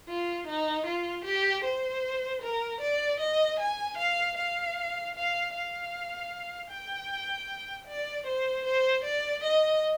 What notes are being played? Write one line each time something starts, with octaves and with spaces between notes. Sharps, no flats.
F4
D#4
F4
G4
C5
A#4
D5
D#5
G#5
F5
F5
F5
F5
G5
D5
C5
C5
D5
D#5